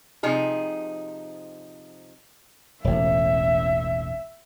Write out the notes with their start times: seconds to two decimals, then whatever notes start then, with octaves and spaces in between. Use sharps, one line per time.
0.23 C3 F3 D#4 G#4
2.84 E1 A1 E5